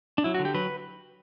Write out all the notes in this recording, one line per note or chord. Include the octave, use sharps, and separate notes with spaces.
D4
F#3 E4
F#4
D3
G4
F#3 B4